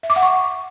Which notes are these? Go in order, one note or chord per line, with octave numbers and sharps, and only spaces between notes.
E5
D6
F#5
C#6